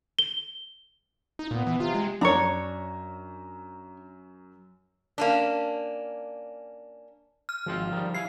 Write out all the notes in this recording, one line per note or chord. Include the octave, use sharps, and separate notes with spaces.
G7
D#4
A#2 B3
E3
C3 F4
G#3
F#2 D4 C#5 A#5
A#3 C#4 D4
F6
G#1 F3 C4
D#3 G3
E4 F5 G#5 C7